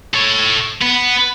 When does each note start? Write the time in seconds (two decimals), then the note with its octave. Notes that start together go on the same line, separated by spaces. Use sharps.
0.14 A4 C#5
0.82 B3